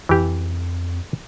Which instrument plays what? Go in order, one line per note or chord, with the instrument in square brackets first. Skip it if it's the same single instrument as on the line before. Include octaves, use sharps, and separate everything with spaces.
[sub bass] F2 [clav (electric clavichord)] E3 G4